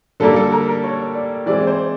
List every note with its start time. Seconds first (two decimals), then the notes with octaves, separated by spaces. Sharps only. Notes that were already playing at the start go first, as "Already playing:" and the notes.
0.20 D3 G3 A#3 A4
0.36 A4
0.52 A#4
0.68 A#4
0.84 C#5
1.15 D5
1.46 E3 G#3 C4 D5
1.67 C5